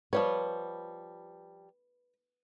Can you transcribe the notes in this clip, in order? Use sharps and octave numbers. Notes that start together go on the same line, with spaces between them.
F3 G3 B4 C#5